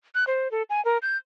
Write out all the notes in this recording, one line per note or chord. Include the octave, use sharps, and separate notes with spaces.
F#6
C5
A4
G#5
A#4
G6